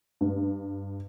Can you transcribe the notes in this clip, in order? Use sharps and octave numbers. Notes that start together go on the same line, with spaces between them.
G2